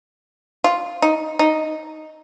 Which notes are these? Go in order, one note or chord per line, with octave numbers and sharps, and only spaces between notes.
F4
D#4
D#4